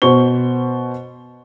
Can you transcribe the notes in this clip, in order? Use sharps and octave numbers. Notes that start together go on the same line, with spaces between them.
B2 F#4 C5 C#6 G7